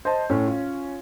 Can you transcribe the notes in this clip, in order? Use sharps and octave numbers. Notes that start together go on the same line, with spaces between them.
C5 D#5 A5
A2 C#4
F4